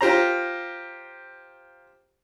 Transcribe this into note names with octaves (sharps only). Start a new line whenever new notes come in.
F4 G4 C5 A#5